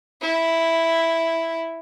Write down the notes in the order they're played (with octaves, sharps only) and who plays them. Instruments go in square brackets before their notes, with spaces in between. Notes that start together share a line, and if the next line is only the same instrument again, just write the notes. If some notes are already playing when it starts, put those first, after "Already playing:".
[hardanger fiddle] E4